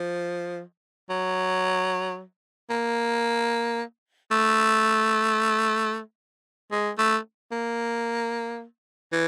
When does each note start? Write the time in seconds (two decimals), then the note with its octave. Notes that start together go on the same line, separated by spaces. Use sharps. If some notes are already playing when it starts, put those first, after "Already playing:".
Already playing: F3
1.10 F#3
2.70 A#3
4.31 A3
6.72 G#3
6.98 A3
7.52 A#3
9.12 E3